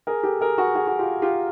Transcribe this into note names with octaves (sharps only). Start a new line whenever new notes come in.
G#4 A#4
G4 A4
G#4 A#4
F#4 G#4
F#4 G#4
F#4
F4 G4
F4 G4